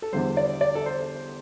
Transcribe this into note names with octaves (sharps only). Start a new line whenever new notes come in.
A4
E2 D3 G3 C5
D5
D5
A4
C5